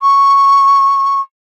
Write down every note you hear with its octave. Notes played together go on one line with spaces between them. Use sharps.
C#6